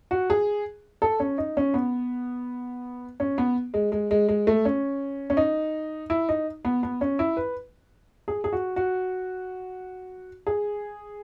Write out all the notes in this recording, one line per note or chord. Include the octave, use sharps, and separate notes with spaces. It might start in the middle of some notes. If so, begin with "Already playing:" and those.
F#4
G#4
A4
C#4
D#4
C#4
B3
C#4
B3
G#3
G#3
G#3
G#3
A3
C#4
C#4
D#4
E4
D#4
B3
B3
C#4
E4
B4
G#4
G#4
F#4
F#4
G#4